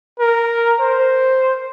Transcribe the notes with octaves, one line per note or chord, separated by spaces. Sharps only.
A#4
C5